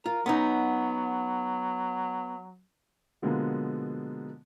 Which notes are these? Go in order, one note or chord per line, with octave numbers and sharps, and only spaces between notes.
F4 A#4
F#3 B3 C#4 D#4
B2 D3 F3 G#3 A#3 B3